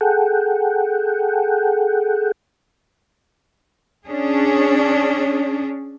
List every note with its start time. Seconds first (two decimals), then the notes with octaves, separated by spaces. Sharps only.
0.01 G#4 A4 F#5 G5
4.06 C#4 D4 G#4